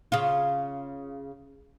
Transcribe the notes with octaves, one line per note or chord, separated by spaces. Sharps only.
C#3 F4